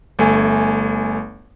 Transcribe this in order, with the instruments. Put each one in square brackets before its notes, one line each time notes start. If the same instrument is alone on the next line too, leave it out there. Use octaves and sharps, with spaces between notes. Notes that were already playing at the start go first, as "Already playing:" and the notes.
[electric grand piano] G1 A3 G#5